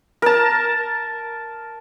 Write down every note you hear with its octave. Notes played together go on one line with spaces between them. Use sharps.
A#4 A5